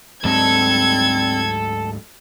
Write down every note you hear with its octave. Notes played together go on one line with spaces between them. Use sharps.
D2 G#2 F#3 G3 C4 A4 G#6